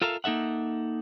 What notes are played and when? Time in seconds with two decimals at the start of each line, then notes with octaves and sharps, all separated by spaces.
0.02 F4 A4 A#4 E5 F5
0.24 A#3 D#4 A4 E5 F#5